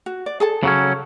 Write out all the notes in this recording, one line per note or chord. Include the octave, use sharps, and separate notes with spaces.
F#4
D5
G#4 A4 A5
C#3 F#3 C#4